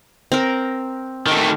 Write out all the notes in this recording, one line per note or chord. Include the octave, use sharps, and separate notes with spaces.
C4 A#4
D#3 A3